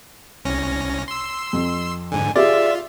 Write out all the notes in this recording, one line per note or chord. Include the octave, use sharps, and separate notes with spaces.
C2 C#4 A#6
C6 E6
F2
G#2 D3 G#5
F4 G4 G#4 D5 E5